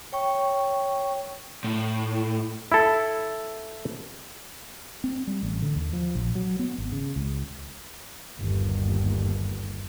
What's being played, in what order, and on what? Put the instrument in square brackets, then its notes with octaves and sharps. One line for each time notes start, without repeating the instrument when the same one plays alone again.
[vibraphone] C#5 G5 C#6
[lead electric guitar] A2
[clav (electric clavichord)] E4 A4
[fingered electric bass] C4
G3
A1
D3
D#2
F3
A#1
F#3
B3
G#1
C#3
C#2
[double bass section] G1 D#2